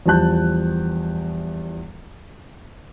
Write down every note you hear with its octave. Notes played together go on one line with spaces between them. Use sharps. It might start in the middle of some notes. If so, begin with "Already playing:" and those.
E2 F3 G3 A5 F#6 G6